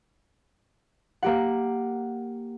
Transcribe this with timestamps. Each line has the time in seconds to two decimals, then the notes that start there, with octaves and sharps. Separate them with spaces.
1.23 A#3 G4 F#5